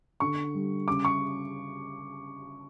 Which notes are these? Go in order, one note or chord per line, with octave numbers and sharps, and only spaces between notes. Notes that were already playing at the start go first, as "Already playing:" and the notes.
D3 C#6
G3
C#3 D6
C#6